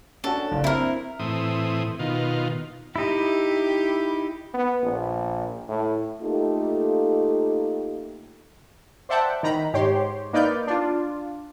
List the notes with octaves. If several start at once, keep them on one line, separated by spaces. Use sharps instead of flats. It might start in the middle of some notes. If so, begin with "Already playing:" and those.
C#4 D4 F#4 A4
F#1 D4
C4 E4 A#4
A2 E3 C4 D#6
B2 D#3 F4
D#4 E4 G4
B3
A#1
A2
A3 A#3 D#4 F4 G4 A4
C5 D5 E5 F#5 G5 A5
D#3 A#5 B5
G#2 G4 C#5 C6
A#3 D#4 B4 D5 F6 G6
D4 F4